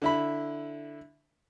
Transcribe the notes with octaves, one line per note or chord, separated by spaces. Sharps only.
D3 E4 B5